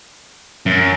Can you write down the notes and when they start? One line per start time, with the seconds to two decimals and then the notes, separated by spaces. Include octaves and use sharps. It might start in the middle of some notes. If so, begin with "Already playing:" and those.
0.66 F#2